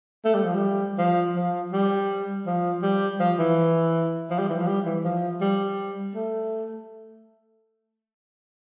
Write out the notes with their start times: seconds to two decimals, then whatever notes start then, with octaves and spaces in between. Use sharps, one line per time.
0.25 A3
0.35 G3
0.44 F3
0.54 G3
0.98 F3
1.36 F3
1.72 G3
2.46 F3
2.82 G3
3.20 F3
3.39 E3
4.30 F3
4.39 G3
4.49 E3
4.57 F3
4.67 G3
4.85 E3
5.04 F3
5.41 G3
6.14 A3